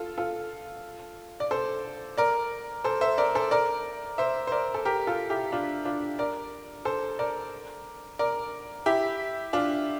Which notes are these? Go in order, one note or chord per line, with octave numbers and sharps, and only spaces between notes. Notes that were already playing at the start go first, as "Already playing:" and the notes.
Already playing: F4 A4
F4 A4
D5
A4 C5
A#4 D5
A4 C5
C5 E5
A#4 D5
A4 C5
A#4 D5
C5 E5
C5
A#4 D5
A4
G4 A#4
F4 A4
E4 G4
D4 F4
D4 F4
A#4 D5
A4 C5
A#4 D5
A#4 D5
E4 G4
D4 F4